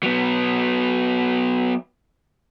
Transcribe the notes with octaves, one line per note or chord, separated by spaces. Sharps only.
F#3 B3